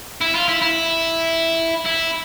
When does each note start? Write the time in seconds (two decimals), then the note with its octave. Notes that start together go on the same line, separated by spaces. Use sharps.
0.21 E4
0.35 F4
0.48 E4
0.62 E4
1.86 E4